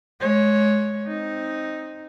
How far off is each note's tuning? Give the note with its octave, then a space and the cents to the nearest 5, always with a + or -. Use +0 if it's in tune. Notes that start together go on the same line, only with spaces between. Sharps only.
G#3 +25 C#5 +0
C4 +5 D#4 +0